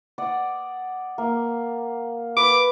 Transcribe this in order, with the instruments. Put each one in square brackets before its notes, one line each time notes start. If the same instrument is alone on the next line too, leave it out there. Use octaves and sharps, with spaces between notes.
[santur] D5 F#5 D#6
A#3
[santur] B4 [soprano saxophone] D6